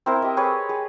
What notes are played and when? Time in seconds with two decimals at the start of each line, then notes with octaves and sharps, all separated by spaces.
0.06 C4 E4 A#4 C5
0.22 G4 D#5
0.37 G4 G#4 B4 C#5
0.69 G#4